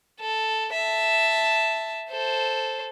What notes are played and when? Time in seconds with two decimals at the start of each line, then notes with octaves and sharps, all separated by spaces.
0.20 A4
0.73 E5 A5
2.11 A4 C5